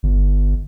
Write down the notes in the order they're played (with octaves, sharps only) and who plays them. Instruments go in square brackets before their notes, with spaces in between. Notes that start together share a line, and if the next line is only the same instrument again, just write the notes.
[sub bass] G1